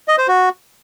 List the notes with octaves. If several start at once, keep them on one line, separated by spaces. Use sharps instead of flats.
D#5
C5
F#4